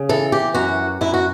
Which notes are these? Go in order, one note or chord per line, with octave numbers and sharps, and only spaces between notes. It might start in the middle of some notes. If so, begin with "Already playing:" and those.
Already playing: C#3
E3 A4
G4
F#2 F#4
F#2 E4
F#4